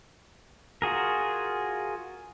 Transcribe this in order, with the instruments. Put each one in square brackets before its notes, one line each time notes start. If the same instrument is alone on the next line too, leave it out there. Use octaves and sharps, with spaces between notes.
[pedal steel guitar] F4 F#4 G#4 A#4